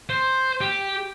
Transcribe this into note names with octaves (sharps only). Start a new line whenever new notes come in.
C5
G4